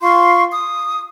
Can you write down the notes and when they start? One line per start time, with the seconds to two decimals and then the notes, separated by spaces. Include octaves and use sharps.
0.02 F4 F5 C6 C#6
0.50 D#6